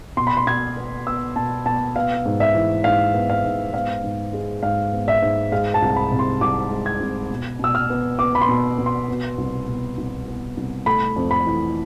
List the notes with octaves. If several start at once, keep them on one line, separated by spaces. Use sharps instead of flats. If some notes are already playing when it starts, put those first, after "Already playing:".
B2 C6
B5
C6
B2 G#6
B3
B3 E6
B2 A5
B2 A5
B3 F5
G#2
E5
E3
G#2 F5
B3
F5
G#2
B3 F5
G#2
G#3
G#2 F5
B3
E5
G#2
G#3 F5
A5
C2
B5
C3
C6
C2 D6
G#3
G#6
C2
B2
B2 E6
F6
B3
B3 D6
B5
C6
B2
B2
C6
B3
C2
B2
C2
B3
C2
A3 B5
F2
B5
E3